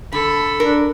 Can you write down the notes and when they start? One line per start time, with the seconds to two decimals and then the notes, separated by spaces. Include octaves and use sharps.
0.12 D3 A4 B5
0.60 D4 A#4